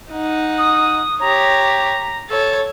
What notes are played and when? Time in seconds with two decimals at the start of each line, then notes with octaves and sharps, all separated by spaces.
0.11 D#4 F#5
0.58 D#6
1.20 G4 C#5 A#5
2.30 A4 C#5